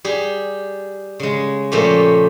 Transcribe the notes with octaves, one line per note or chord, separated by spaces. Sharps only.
G3 G4 G#4
C#3 G#3
A#2 F3 A3 C#4 G4